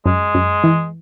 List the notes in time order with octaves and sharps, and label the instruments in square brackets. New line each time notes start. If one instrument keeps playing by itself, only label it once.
[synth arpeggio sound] F#2 [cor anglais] G#3
[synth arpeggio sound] F#2
E3